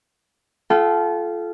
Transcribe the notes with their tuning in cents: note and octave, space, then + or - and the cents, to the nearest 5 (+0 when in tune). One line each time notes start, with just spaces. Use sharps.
F4 -15 A4 -30 G5 -40